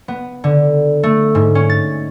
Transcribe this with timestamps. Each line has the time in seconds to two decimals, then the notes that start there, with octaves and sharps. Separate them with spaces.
0.08 B3
0.44 D3
1.03 A3
1.35 G#2
1.55 C#4
1.70 A6